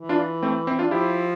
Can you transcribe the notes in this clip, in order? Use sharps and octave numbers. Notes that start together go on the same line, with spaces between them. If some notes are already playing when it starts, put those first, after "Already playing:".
Already playing: E3
D4 F4
A3 C4
C4 E4
D4 F4
F3 E4 G4